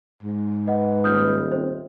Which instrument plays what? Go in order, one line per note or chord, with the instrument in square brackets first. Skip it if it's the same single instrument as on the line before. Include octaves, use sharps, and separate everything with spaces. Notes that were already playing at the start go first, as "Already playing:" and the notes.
[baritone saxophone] G#2
[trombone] B4 [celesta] D#5 F#5
[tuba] D#1 [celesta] D#6 F6 G6
[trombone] C4 [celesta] C5